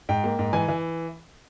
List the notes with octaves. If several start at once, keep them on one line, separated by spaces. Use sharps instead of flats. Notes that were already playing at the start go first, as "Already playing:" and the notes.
G#2 G5
A#3
G#2
E3 G#5
E3